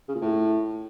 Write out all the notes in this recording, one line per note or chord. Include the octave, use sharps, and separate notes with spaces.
C#3
A#2
A2